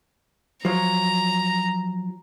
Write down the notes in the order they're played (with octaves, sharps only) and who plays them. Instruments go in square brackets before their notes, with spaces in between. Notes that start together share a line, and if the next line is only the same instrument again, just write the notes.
[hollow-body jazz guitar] F3 F#3 [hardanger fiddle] A#5